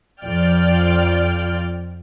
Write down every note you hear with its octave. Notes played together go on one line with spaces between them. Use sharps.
F2 F4 D5 G5 F6